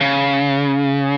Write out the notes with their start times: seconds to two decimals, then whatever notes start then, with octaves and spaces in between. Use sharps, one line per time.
0.01 C#3